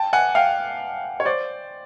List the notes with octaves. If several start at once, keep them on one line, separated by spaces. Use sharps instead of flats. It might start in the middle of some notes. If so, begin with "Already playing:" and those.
Already playing: G5 A5
F#5 G#5
F5 G5
C#5
C5 D5